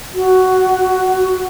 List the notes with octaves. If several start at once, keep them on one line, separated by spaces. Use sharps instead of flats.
F#4